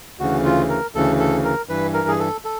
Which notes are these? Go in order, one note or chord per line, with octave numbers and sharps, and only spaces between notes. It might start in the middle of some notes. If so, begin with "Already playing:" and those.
D2 C#3 E3 F#4
F4
A#4
D2 C#3 E3 A4
A4
A#4
G2 E3 B4
A#4
G#4
A4
A4